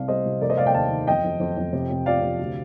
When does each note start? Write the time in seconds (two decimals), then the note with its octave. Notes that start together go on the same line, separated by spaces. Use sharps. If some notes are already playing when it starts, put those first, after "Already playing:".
Already playing: C2 C3 D5 F5
0.08 G3 C5 D#5
0.25 C2
0.41 F1 A#4 D5
0.49 C5 D#5
0.57 F1 D5 F5
0.66 D#5 G5
0.74 D#2 F5 A5
0.91 D#3
1.07 F2 D#5 G5
1.24 F2
1.40 F2
1.57 F2
1.73 C3
1.90 C3
2.06 F3 D5 F5
2.22 C3
2.39 D2